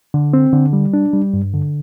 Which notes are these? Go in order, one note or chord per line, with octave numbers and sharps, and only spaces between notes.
D3
C4
D3
G3
D4
G3
G2
D3